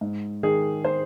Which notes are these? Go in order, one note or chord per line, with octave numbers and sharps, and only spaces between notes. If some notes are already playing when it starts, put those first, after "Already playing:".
G#2
D#3 G#4
C5